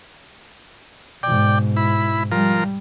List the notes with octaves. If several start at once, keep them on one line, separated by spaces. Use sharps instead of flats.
G#2 B2 D5 G5
E4 B5
F3 G3 F4 A#4